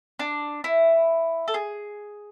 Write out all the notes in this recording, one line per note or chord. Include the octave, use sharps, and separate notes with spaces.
D4
E4
A4
G#4